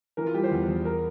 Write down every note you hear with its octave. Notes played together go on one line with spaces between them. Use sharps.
E3 A#4
F4
G3 G4
C5
E2
E2
A#4